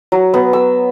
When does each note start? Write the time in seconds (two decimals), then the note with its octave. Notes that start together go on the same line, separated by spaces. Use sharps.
0.12 F#3
0.34 B3
0.53 E6